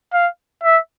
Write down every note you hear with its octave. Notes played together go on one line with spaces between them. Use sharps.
F5
E5